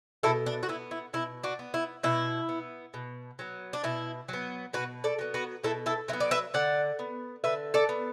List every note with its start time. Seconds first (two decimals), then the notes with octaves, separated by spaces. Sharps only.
0.23 B2 E4 A4
0.46 D4
0.63 F#4
0.69 B3 E4
0.91 E4
1.13 B2 E4
1.44 D4 F#4
1.59 B3
1.74 E4
2.03 B2 E4
2.49 B3
2.94 B2
3.39 F#3 B3
3.73 D4
3.83 B2 E4
4.29 F#3 B3
4.73 B2 F#4 B4
5.04 A4 D5
5.19 F#3 B3
5.34 F#4 B4
5.64 B2 E4 A4
5.86 E4 A4
6.08 F#3 E4
6.13 B3
6.20 D5
6.31 B4 E5
6.54 D3 D5 F#5
6.99 B3
7.44 D3 B4 E5
7.74 A4 D5
7.89 B3